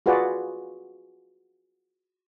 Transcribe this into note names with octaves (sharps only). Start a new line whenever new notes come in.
F4 F#4 G#4 B4 D5 F#5